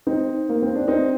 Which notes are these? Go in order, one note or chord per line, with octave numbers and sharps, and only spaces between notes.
C4 D#4
A#3
C4
D4
C4 D#4